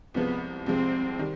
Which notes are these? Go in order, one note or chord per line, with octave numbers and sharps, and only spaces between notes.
C2 C3 F3 G#3 B3
C2 C3 F3 G#3 C4
D#3 G3